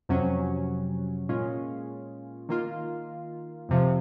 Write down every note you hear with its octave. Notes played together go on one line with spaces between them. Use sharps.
F2 C3 F#3 C#4
A#2 G#3 C#4 F4
D#3 A#3 F4
F2 C3 F3